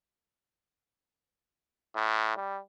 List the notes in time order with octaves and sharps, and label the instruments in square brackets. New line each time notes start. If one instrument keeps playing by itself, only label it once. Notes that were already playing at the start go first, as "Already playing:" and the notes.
[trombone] A2
G3